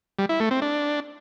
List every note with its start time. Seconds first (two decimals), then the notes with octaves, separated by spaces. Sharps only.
0.19 G3
0.29 E4
0.40 A3
0.51 C4
0.62 D4